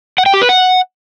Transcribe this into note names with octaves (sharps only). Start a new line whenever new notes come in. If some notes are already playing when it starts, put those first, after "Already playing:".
F#5
G5
G4
B4
F#5